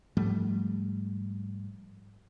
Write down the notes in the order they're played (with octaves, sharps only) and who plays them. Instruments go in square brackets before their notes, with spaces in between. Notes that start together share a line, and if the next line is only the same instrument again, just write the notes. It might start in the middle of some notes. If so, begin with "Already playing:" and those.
[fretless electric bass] G#2 F3 G3 A3